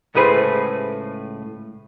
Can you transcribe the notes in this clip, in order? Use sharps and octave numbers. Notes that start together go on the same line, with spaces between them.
C#2 A2 A3 G#4 B4 C5